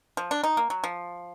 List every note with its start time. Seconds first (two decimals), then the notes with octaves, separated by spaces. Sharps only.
0.17 F3
0.31 D4
0.43 D#4
0.57 A#3
0.70 F#3
0.84 F3